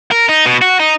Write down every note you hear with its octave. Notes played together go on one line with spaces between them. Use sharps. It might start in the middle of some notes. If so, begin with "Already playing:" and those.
A#4
D#4
B2
F#4
D#4